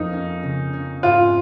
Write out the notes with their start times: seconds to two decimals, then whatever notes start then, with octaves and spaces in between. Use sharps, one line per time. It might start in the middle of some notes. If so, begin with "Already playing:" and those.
Already playing: F2 A#3 D#4
0.13 C#4
0.43 C#3
0.73 C#4
1.03 G#2 F4